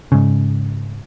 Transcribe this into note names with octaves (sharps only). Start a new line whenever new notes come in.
G#2 C#3